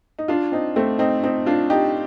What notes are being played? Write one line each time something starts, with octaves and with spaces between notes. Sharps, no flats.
D#4
D4 F4
C4 D#4
A3 C4
C4 D#4
C4 D#4
D4 F4
D#4 G4